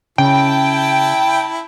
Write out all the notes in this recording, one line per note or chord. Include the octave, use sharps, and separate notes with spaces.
C#3 E4 G5 A5